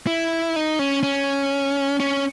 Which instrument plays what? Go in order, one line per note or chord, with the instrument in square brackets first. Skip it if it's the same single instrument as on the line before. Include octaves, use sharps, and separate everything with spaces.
[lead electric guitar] E4
D#4
C#4
C#4
C#4